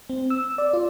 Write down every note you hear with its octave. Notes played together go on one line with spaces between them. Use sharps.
C4
E6
D5
F4